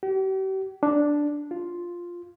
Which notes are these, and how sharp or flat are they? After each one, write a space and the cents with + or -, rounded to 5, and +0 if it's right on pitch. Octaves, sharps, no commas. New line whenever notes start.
G4 -40
D4 +0
F4 +0